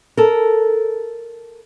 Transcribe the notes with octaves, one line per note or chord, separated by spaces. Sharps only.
A4 A#4